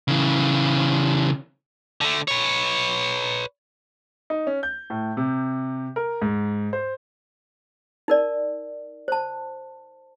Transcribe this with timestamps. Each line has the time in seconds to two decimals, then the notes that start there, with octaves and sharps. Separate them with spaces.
0.08 C#3 E3
2.01 D3 A3
2.28 B4 C#5
4.30 D#4
4.47 C#4
4.63 G6
4.90 A2
5.17 C3
5.96 A#4
6.22 G#2
6.73 C5
8.08 D#4 A#4 D5
9.08 C5 A5